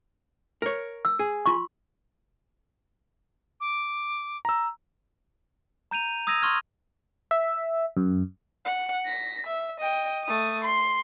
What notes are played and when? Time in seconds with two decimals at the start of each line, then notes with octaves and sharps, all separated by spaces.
0.62 A#4 C#5
1.05 E6
1.19 G#4
1.46 F4 C6 C#6
3.61 D6
4.45 A#5 E6
5.91 A#5 G6 D#7 F7
6.27 D#6 E6 G#6 A#6 D#7 F7
6.42 C6 C#6 F6 G#6
7.31 E5
7.97 F#2
8.65 F#5
9.06 A#6 B6
9.47 E5
9.80 D#5 G5
10.24 A3 D#6
10.64 C6